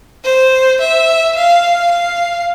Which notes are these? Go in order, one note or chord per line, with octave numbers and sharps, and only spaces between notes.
C5
E5
F5
F5